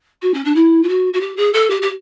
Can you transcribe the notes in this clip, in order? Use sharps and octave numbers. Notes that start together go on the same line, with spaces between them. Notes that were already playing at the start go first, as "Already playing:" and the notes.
F#4
C#4
D4
E4
F4
F#4
F#4
G4
G#4
A4
G4
G4